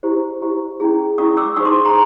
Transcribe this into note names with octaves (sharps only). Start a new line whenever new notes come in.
E4 G4 C5
E4 G4 C5
C#4 E4 G#4
C#4 E4 G#4 C#6 D#6
D6 E6
D#4 G#4 C5 C#6 D#6
C6 D6
A#5 C6